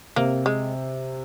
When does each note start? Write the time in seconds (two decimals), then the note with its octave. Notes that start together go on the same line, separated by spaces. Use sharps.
0.16 C3 A#3
0.46 G#3